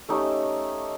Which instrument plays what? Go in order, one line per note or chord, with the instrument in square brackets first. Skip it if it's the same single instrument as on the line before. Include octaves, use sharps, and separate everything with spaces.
[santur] A3 C#4 D#4 G4